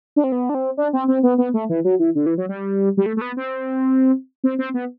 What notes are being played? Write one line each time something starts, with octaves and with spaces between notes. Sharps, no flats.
D4
C4
B3
D4
C4
D4
C4
C4
B3
B3
A3
E3
F#3
E3
D3
E3
F#3
G3
G3
A3
A3
B3
C4
C4
C4
B3